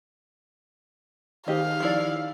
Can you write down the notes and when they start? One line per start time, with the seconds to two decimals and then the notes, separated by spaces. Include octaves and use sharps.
1.48 D#3 G4 G#4 C5 D#5 F5
1.80 F3 E4 D5